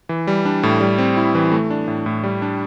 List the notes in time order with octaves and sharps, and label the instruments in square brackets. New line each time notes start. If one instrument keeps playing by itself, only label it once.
[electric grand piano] E3
G3
D4
A2
G3
C4
E4
E3
A3
D4
A2
A2
G3
D4